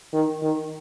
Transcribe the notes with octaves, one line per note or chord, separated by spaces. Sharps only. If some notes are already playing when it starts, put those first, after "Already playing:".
D#3
D#3